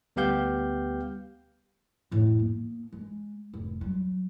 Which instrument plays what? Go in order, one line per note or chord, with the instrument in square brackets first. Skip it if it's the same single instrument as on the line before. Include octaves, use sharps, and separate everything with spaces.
[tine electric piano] D2 G3 B3 G4 F5 G6
[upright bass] F2 A2
A#3 B3
G#3
F1 G#2
F#3 G3